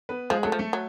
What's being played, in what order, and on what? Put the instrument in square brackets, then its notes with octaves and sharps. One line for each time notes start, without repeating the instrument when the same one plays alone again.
[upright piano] B3 B4
[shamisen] F3 [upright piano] G#3 G#4
[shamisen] F#3 [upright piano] A3 A4
[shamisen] F3
[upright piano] A3 A4
[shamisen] F#3